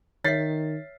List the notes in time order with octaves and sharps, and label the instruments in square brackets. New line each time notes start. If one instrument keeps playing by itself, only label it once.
[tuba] D#3 [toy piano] C#5 E5 [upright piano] A6 B6 C7